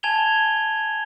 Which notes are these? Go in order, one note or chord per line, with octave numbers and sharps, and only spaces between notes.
G#5 A5 G#6 E7 F7 G7